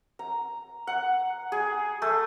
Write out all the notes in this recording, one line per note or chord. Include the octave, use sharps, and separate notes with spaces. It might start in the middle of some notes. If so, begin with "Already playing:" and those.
A#5
F#5
G#4
A3